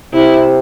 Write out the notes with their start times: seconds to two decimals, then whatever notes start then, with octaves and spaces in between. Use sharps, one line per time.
0.13 C3 E4